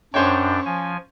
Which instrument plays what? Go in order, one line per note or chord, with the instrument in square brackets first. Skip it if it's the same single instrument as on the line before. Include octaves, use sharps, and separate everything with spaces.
[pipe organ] F#2 D4 G5 [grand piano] C#4 C5 C#5
[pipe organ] F3 G#5